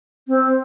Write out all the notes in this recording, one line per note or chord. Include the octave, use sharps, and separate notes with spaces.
C4